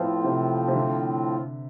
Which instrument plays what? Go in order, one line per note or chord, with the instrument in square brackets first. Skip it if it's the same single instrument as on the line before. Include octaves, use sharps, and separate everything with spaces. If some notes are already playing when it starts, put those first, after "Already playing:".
Already playing: [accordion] A2 F3 C4 F4 [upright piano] B3
[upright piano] C3
C3
D3